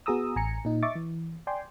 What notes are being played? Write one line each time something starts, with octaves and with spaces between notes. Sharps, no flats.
B3 F#4 G#4 A#5 D#6 E6
A1 G#5 A#5 C#7
A#2 D#4
D#5 E5 C#6 D6 A6
E3
D5 G5 G#5 C6